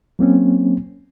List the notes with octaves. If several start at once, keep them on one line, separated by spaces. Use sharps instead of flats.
F#3 A#3 C4 C#4